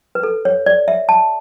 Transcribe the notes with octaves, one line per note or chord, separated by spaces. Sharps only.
B4
A4
C#5
D5
E5
A5